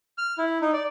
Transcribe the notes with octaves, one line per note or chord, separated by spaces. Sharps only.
F6
E4
D#4
D5